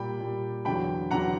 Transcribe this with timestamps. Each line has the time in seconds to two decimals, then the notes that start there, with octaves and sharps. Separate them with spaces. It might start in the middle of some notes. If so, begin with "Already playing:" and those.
Already playing: A#2 G3 G5 B5
0.20 A#2 G3
0.65 E2 D3 F#3 G5 B5
1.11 E2 D3 F#3 F#5 A#5